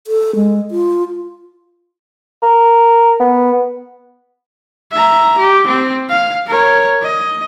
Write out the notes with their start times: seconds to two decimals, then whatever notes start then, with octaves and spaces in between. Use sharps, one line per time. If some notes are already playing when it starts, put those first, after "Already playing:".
0.07 A4
0.36 G#3
0.71 F4
2.43 A#4
3.20 B3
4.91 E5 A#5
5.38 G4
5.67 C4
6.09 F5
6.47 A#4 C#5
7.03 D#5